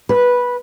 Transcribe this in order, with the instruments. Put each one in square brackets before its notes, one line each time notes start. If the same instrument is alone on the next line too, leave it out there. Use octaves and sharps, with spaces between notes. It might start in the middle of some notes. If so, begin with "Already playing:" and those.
[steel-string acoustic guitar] B4